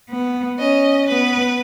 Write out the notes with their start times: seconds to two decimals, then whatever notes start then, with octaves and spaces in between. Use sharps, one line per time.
0.11 B3
0.59 C#4 D#5
1.08 B3 B4